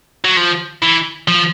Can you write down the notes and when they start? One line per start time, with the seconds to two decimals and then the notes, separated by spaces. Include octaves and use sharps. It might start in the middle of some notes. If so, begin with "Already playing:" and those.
0.24 F#3
0.37 F3
0.83 E3
1.28 F3